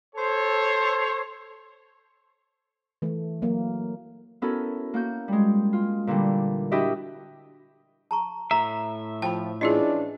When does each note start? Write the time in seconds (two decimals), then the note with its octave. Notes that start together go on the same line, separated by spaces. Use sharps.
0.15 A4 C5 C#5
3.02 E3 A3
3.42 F#3 A#3
4.42 B3 C#4 E4 F#4 A4 A#4
4.94 A#3 F#4 G6
5.28 G3 G#3
5.73 F4
6.07 A#2 D3 E3 G3
6.72 D4 E4 F#4 G4 D#5 E5
8.11 A5 A#5 C#6
8.51 A2 E5 F5 A#5
9.22 F3 G5 A5 B5
9.61 E3 C#4 D4 E4 F4 G#4 D#5